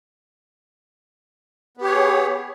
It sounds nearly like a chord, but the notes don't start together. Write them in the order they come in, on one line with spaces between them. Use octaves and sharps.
B3 G4 C#5 G#4